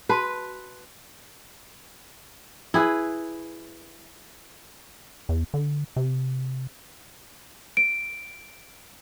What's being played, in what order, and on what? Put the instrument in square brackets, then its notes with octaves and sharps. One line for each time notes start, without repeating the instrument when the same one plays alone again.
[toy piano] F#4 A5 C6 [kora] B4
[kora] E4 G#4 B4
[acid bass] E2
D3
C3
[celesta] D7